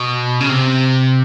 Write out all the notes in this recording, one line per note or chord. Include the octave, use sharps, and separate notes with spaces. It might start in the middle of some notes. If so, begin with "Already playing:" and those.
Already playing: B2
C#3
C3